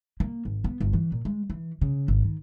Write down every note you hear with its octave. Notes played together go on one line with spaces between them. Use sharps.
A#3
G#1
B3
G1
E3
A#2
G#3
E3
C#3
G#1
D#3